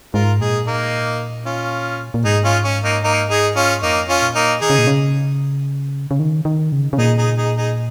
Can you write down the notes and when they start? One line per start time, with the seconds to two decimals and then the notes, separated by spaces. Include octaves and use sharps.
0.14 G#2 F4 A#4
0.41 A#2 D#4 G#4
0.67 A#3 D#4
1.46 C#4 F4
2.14 A#2
2.24 G#2 D#4 G#4
2.44 C#4 F4
2.64 C#4
2.84 A#3 D#4
3.04 A#3 D#4
3.30 D#4 G#4
3.56 C#4 F4
3.83 F2 A#3 D#4
4.09 C#4 F4
4.22 A#2
4.35 A#3 D#4
4.61 D#3 D#4 G#4
4.70 C#3
4.78 A#2
4.87 C#3
6.11 C#3
6.20 D#3
6.45 D#3
6.72 C#3
6.93 C#3
6.98 A#2 D#4 G#4
7.18 D#4 G#4
7.38 D#4 G#4
7.57 D#4 G#4